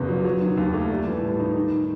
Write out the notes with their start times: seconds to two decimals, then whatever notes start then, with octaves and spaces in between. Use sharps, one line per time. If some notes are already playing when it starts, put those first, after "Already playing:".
Already playing: F#1 E2 B2
0.09 F#3
0.25 F#3
0.41 D#3
0.57 D#2
0.74 A3
0.90 G3
1.06 E3
1.22 A2
1.40 D#4
1.56 D#3